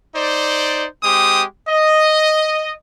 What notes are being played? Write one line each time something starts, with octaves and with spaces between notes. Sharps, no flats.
D#4 C5 D5
G#3 C4 G4 D#6
D#5